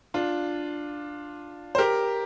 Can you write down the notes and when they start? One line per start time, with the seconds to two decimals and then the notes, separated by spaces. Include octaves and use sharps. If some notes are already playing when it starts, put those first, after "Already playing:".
0.14 D4 F4
1.75 C5
1.78 G4 A#4